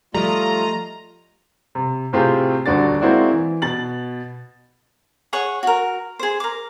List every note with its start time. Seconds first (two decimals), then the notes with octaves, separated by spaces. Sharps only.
0.14 F3 G3 A3 F4 D#5 A#5
1.75 C3
2.13 A2 C3 C4 F4 G4 G#4
2.66 D#1 D2 D3 F#4 D5 A6
3.01 G#3 A#3 C4 E4 F#4 D5
3.31 E3
3.62 B2 A6 F#7
5.33 G#4 C#5 F#5 C#6
5.63 F#4 A#4
6.19 G#4 C5
6.40 A#4 D6